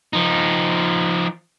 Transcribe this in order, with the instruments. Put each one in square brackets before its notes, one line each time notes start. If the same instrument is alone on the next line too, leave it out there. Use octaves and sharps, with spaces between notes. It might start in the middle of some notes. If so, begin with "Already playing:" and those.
[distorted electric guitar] F3 D#4